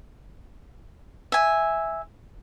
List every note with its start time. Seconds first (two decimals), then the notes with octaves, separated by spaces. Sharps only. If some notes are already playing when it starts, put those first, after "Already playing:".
1.32 E5 G#5